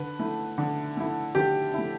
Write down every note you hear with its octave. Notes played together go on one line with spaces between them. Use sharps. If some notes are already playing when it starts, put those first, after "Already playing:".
Already playing: D3 B4
A3 E4
D3
A3 E4
D3 G4
A3 E4